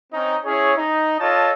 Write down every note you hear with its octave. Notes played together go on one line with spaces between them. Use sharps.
C4 C#4 D#4
C#4 E4 G#4 C#5
D#4
F4 A4 C#5 D#5 A5